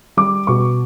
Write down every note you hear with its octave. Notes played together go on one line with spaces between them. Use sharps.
G3 D6
B2 C#6